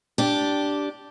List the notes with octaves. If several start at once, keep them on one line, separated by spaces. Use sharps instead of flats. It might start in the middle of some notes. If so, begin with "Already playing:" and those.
D4 G4